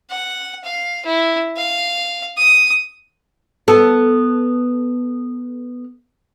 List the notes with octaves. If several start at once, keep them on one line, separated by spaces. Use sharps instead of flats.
F#5
F5
E4
F5
D#6
B3 A4